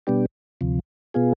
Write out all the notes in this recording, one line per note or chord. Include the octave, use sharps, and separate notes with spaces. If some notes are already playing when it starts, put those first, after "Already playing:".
B2 G3 B3 D4 G4
D2 C3 F3
B2 B3 F4 G#4